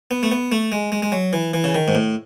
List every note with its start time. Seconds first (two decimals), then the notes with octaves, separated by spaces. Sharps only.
0.11 B3
0.23 A3
0.32 B3
0.52 A3
0.72 G#3
0.92 G#3
1.02 G#3
1.12 F#3
1.33 E3
1.54 E3
1.64 C#3
1.75 D#3
1.88 G#2
1.95 A2